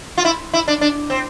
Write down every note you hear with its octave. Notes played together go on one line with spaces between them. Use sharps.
F4
E4
E4
D4
D4
C4